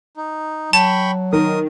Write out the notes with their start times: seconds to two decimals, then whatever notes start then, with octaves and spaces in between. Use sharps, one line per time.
0.17 D#4
0.73 F#3 G5 A5 B5 C#6
1.33 D#3 A#4 D#6